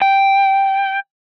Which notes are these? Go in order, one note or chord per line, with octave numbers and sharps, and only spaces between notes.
G5